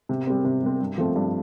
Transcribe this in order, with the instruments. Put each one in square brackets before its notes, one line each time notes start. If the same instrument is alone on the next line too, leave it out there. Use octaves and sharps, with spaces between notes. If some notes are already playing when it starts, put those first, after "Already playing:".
[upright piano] C3
G3 C4
C3
G3 C4
G2
F3 A3 C4
G2